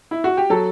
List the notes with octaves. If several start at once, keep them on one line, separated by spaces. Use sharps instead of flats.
E4
F#4
G4
F#3 A4